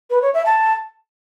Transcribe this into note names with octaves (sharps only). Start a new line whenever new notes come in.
B4
C#5
E5
A5